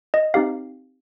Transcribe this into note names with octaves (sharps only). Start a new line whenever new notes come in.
D#5
C4 D#4 G4 F5